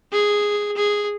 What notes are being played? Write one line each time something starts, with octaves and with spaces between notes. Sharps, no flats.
G#4
G#4